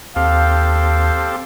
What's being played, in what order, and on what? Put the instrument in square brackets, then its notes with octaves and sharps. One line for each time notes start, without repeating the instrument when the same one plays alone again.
[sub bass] D#2 [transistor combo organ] C4 G4 A4 [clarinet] F5